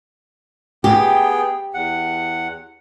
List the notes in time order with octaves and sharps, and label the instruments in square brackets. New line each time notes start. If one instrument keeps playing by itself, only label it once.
[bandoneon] B3 G#4 G5 [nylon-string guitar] G4
[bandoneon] E2 F#5